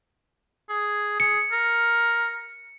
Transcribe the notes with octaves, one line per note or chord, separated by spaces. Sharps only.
G#4
G#4 C#7
A#4